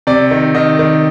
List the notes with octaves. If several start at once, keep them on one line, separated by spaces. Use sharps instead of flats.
C3 D5
D#3
D#3 D#5
D#3